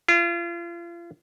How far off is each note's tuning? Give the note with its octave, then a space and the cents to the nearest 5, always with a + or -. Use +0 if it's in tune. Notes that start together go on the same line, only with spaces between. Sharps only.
F4 -35